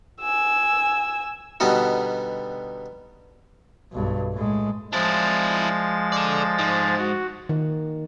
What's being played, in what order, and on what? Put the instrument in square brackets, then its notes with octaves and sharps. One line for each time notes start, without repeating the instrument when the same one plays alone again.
[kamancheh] G#5 E6
[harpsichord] B2 D3 G3 B3 D#4 F#4
[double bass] B1 G2
A2 G#3
[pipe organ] F3 G#3 A6 [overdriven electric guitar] D4 E4
[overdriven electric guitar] A4 D5
G#2
[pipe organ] F#4
[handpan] D#3